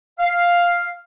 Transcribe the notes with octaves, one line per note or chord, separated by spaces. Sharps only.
F5